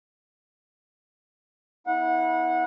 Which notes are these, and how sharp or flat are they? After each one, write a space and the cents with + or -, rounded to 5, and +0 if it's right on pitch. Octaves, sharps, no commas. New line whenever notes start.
B3 +15 E4 -30 F#5 -25